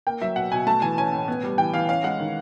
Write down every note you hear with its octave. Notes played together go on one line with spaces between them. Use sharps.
A#3 G5
F#3 E5
B2 F#5
B2 G#5
A3 A5
E3 G#5
C#4 G#5
A2
B3
G3
E3 G5
E3 F5
C#4 F5
G#3 F#5
D#3